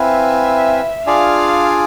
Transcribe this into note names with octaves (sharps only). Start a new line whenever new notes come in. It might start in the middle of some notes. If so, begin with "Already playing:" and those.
Already playing: C4 E4 B4 E5 F5 G#5
D4 F4 G#4 D5 F5 G#5